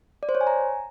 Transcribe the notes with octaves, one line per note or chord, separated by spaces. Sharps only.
D5
C5
C#5
G#5
A#5